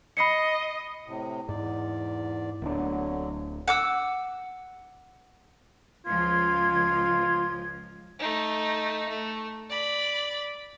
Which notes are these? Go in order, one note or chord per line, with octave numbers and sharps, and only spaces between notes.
D#5 B5 C7 C#7
A2 C3
E2 G#2 D5
D1 D3 F#3 B3 D4
F#5 D6 E6
C#2 F3 F4 G#6
A3 D#4
A3
D5 B5